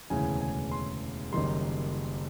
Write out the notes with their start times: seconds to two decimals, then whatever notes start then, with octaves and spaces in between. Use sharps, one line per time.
0.10 E1 D2 C#3 E3 G#5
0.41 G#5
0.71 C6
1.32 F#1 F#2 D#3 G3 C6